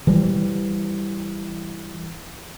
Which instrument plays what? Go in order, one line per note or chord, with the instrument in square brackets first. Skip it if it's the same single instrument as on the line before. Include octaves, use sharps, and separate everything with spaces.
[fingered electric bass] E3 G3